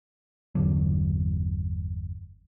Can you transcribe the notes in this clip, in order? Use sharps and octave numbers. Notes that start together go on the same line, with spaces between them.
G1 E2 D3 F#3